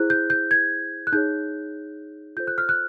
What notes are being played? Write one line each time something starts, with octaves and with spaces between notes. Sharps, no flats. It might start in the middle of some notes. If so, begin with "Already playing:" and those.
Already playing: E4 G#4 C5 F#6
G6
G6
G#6
F#6
D#4 G#4 C#5 G6
F4 A4 C5 G6
F#6
F6
F#6